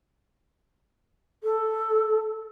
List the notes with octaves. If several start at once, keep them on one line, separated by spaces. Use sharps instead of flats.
A4